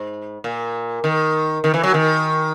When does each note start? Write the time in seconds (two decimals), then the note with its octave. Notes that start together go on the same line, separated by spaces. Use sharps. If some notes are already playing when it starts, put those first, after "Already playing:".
Already playing: G#2
0.44 A#2
1.04 D#3
1.64 D#3
1.74 E3
1.84 F#3
1.94 D#3